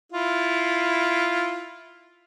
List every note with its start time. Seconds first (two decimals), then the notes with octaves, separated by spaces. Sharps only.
0.12 E4 F4